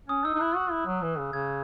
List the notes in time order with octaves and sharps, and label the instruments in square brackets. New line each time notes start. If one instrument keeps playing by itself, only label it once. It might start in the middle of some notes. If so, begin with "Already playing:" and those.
[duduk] C#4 [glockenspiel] D#6
[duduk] D#4 [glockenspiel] E6
[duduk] D#4
[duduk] E4 [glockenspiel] F#6
[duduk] F#4
E4
F#3
E3
C#3
[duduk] C#3 [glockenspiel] G#6